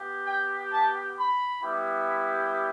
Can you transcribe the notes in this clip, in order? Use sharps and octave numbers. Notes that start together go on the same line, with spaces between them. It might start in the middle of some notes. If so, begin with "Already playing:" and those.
Already playing: B3 G4
G5
A5
B5
G3 B3 E4 G4